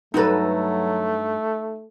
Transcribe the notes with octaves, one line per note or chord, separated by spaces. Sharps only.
G2 F#3 A3 D#4 F#4 A4 B4